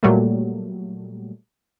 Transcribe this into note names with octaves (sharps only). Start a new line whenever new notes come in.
A#2 F#3 G3 A3